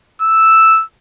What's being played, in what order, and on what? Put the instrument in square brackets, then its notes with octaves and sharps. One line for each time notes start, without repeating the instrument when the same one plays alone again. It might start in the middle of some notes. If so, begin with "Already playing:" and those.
[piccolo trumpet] E6